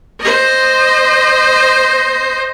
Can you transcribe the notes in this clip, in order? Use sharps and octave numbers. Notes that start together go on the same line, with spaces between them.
C5 D#5